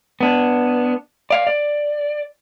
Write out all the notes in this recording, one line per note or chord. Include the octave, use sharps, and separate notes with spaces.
B3 D4
D5 F5
D5